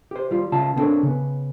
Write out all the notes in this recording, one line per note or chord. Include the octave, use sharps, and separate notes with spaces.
G4 C5
G3 F4
C#2 C#3 F4 A5
B3 C4 D4 A4 A#4 C#5
C#3 B3